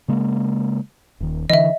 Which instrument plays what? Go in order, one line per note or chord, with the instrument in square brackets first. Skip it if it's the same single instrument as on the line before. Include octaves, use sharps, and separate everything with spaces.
[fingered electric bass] C#3 G#3 A#3
D#1 D#3
[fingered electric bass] D3 E3 [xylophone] D#5 E5